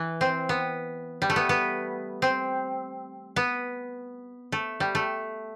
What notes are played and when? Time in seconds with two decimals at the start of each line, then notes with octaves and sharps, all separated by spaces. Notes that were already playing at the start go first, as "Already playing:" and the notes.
Already playing: E3
0.21 C4
0.49 B3
1.22 G3
1.30 A3
1.36 B3
1.49 B3
2.22 C4
3.36 B3
4.52 A3
4.80 G3
4.95 A3